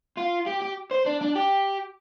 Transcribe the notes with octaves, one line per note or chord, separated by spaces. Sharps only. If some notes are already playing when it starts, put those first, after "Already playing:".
F4
G4
G4
C5
D4
D4
G4